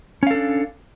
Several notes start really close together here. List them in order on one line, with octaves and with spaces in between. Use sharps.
C#4 F5 A4 D4